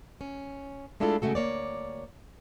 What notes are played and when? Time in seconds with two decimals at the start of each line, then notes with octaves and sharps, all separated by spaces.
0.21 C#4
1.00 G#3 A3 D4 E4 F4 A4
1.22 C#3 G#3 A3 F#4 A4
1.35 D2 A#3 C#5 D5